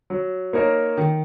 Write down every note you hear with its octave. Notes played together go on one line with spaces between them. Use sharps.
F#3
A#3 D#4 A#4 C#5
D#3